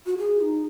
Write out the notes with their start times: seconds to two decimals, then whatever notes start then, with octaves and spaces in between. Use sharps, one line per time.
0.06 F#4
0.18 G#4
0.41 D#4